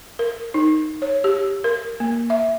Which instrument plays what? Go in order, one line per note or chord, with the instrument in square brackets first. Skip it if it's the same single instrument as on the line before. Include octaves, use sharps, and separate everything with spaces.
[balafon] A#4
D#4
C#5
G4
A#4
A#3
E5